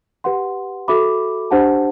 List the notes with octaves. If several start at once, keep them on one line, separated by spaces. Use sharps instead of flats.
G4 B4 F#5 C6
F#4 A4 E5 B5 D6
D4 G4 C5 F#5 A5